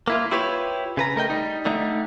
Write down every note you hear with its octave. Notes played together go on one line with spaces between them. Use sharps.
A#3 E4 F4
E4 F4 G4 B4 C#5
C#3 B4 A#5
A3 A#4 D#5 G5
G3 D#4
D3 G3 A3 D#4